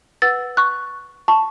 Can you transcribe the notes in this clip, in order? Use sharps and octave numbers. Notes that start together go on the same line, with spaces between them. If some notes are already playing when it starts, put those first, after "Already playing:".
B4 F#5 E6 A6
C#6 F#6
A5 C#6